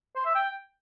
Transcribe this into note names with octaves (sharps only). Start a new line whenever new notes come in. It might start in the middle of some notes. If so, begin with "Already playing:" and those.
C5
E5
G5